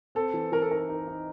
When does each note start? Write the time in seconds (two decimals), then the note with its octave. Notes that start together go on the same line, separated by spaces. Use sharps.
0.15 C4 A4
0.34 E3
0.52 E3 A#4
0.62 A4
0.71 D#4 A#4
0.89 D#4
1.08 D#4